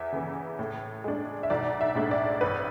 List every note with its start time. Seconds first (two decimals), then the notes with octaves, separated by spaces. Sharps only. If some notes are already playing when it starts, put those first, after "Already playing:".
Already playing: E2 E5
0.13 C#3 E3
0.59 A2
1.04 G#3 D4
1.43 E5
1.50 B1 D5
1.81 E5
1.95 A2 G#3 D4
2.11 D5
2.41 A1 B4